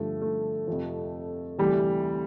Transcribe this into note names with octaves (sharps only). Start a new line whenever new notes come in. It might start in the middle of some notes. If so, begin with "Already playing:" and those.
Already playing: G2 D3 F3 A3
A3
F2 C3 F3
D2 C3 E3 G3